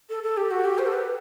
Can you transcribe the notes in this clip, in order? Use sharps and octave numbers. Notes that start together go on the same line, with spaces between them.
A4
A4
G4
F#4
G4
C5
A4
B4